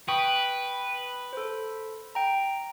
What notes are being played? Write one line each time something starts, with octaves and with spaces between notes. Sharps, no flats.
B4 G5 C#6 D#6
A4 C5
G5 A#5